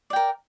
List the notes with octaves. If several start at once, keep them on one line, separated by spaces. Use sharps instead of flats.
A#4 D5 G5